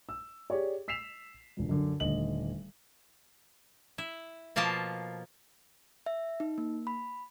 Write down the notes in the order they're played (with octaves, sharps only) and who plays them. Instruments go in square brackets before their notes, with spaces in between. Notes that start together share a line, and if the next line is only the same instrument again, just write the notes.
[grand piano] E6
G4 G#4 C#5 D5
E6 B6 C7 E7 F7
E1 C#2
F#2 D3
D#1 D3 A3 D#5 F#7
[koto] E4
B2 F3 A#3 F4 A5
[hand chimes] E5
D#4
A#3
B5